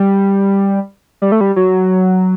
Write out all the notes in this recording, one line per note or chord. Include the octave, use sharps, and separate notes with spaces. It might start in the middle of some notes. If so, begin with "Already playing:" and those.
Already playing: G3
G3
A3
G3
F#3